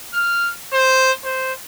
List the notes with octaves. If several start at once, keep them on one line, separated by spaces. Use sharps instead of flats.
F6
C5
C5